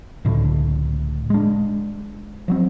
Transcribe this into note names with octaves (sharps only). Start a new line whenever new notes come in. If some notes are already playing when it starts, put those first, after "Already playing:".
C#2 A2 D3
G#3 D4
F3 F#3 C4